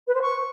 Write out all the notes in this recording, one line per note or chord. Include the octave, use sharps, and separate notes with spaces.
B4
C5
C#6